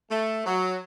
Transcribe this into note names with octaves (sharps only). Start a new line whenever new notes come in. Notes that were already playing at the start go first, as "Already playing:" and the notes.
A3
F#3